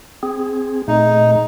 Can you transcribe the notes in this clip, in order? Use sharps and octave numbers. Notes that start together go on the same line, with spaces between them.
C4 G#4
A#2 A3 D#4 G#4 D#5